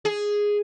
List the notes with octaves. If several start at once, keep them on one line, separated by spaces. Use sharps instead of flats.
G#4